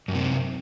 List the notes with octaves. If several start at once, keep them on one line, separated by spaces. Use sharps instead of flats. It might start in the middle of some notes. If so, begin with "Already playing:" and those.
F#2 A2 C3